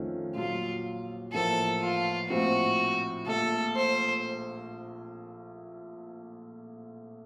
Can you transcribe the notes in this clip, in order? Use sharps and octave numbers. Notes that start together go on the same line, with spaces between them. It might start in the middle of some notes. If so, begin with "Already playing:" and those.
Already playing: F2 D#3 A3 C#4 F4
A#1 A#2 F#3 F4
A1 A2 F3 A#3 A4
F4
A#1 A2 F3 C4 F#4
A#1 A#2 A3 A4
C5